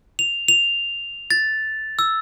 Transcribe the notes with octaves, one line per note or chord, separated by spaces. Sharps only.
F7
F7
A6
E6